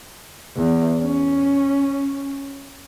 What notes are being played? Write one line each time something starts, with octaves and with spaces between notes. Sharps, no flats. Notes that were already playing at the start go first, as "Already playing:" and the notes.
E2
C#4